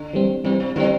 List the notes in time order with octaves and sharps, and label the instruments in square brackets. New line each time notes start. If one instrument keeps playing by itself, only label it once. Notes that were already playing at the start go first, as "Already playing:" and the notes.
Already playing: [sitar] D3
[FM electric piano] E3 G3 C4
[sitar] C3 [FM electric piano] E3 G3 C4
[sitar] C3
[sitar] D3 [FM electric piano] E3 G3 C4